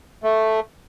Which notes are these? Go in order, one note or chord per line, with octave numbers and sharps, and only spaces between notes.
A3